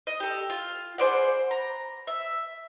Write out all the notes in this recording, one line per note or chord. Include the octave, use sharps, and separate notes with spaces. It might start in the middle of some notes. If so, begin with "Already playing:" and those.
D#5
G4 A4
F4
G#4 C5 D5 F#5
A#5
E5